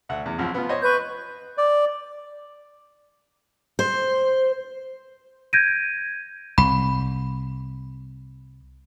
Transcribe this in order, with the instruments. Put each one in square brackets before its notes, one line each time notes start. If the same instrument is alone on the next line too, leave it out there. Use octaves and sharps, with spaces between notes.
[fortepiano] D2 E5 F#5
E2
C2 F#2 F3
B3 F4
C5 C#5 D#5
[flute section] B4 C#6 G6
[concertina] D5
[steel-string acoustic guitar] C5
[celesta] G6 G#6 A#6 D7 D#7
[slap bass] C2 [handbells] B5